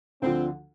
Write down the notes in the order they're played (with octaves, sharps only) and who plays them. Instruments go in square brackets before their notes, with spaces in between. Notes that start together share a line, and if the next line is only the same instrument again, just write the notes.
[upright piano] D2 D3 F3 [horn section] C4